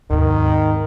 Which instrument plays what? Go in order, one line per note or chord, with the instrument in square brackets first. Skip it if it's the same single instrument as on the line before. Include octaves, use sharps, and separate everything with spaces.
[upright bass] D#2 C3 [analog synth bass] G#2 [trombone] D#3